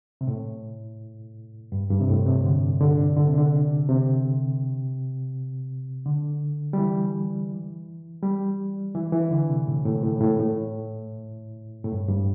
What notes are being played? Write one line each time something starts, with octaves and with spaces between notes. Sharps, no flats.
C3
A2
G2
G2
C3
A2
C3
D3
D3
D3
C3
D3
C3
D3
G3
E3
G3
E3
E3
D3
C3
A2
A2
A2
A2
A2
A2
G2
G2